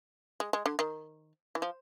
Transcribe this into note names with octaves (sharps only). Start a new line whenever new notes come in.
G#3
G#3
D3
D#3
E3
F3